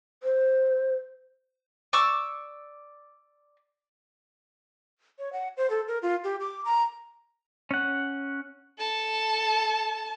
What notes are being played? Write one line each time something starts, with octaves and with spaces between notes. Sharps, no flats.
C5
D5 C#6 E6
C#5
F#5
C5
A4
A#4
F4
G4
D6
A#5
C#4 F#5
A4 A5